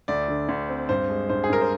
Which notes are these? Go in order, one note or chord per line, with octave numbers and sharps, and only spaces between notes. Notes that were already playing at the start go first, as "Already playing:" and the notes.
D2 D5
D3
D2
C4
G2 C5
G#3
G2 C5
G#4
G2 A#4
C5